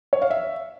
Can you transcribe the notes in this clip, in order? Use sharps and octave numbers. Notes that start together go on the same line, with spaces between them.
C#5
F5
E5